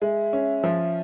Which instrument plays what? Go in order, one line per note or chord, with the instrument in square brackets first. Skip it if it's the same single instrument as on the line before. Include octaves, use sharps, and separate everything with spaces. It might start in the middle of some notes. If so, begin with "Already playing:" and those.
[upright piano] G#3 [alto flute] E5
[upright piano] C#4
F3